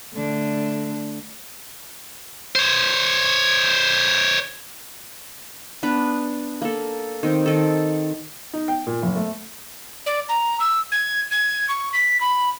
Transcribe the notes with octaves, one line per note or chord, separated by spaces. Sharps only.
D3 A3 D4
C5 C#5
B3 D4 B4
A#3 A4
D#3 C4
D#3 A4
D#4
G5
A#2
F#1
A3
D5
A#5
E6
G#6
G#6
C#6
B6
B5